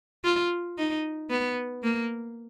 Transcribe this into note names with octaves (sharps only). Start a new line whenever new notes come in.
F4
D#4
B3
A#3